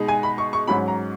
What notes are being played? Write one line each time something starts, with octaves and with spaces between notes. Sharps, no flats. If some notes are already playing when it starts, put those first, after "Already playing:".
Already playing: B2 G#3 D#4
G#5
B5
C#6
C#6
G#2 F#3 C#4 B5
A#5